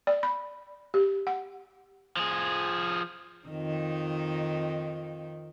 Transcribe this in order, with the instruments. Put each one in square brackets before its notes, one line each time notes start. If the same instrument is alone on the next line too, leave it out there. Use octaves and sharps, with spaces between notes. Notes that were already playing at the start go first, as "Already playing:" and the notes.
[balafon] D5
B5
G4
F#5
[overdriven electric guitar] F3 G#4
[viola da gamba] F2 D#3 D#4